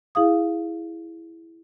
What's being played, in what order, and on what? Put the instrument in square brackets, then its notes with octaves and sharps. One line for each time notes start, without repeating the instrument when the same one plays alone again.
[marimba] E4 G#4 F5 D#6